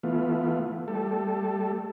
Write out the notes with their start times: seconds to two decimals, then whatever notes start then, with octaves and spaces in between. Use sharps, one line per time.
0.03 E3 A3 B3 F4
0.88 G3 A3 A4